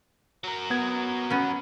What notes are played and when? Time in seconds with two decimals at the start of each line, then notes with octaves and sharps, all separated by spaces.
0.44 F#3 A#4
0.70 B3 G#6
1.30 B3 C#4